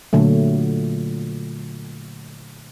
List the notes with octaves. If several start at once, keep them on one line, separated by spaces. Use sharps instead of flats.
A#2 D3 F#3 A3